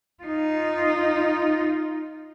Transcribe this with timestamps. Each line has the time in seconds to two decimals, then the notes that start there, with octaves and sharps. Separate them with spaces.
0.23 D#4 F4